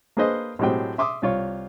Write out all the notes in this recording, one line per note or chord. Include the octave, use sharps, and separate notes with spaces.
A#3 D4 G#4 B4 C5 D#5
A2 F#3 G#3 C4 G4 G5
E5 C6 D6 D#6
C2 F4 C#5